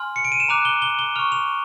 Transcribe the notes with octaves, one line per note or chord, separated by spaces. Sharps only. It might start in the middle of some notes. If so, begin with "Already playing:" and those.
Already playing: G#5 C6 F6
C#7
D7
D#7
E7
A#5 D6 F#6 F7
G7
G7
G7
C#6 F6 F7
F7